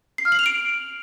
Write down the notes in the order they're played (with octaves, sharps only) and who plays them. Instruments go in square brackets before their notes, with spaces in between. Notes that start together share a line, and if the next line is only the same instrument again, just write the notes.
[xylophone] C7
F6
F#7
F7
D7